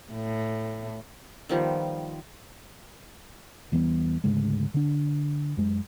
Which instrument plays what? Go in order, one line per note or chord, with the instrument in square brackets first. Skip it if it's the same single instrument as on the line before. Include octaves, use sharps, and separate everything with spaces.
[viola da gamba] A2
[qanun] D#3 F3 G3 B3
[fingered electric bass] E2 E3 G3 B3
D2 G#2 C#3 G#3
D3 D4
F#2 G#3